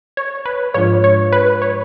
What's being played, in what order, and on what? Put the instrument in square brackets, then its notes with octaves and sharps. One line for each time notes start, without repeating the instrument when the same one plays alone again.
[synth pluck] C#5
B4
[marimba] G#2 F3 G#3 D4 F4 [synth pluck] C#5
[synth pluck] C#5
B4
C#5